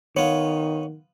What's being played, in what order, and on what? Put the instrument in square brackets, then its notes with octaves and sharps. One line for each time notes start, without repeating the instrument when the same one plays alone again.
[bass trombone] D#3 [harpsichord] B3 F4 [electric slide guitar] C#5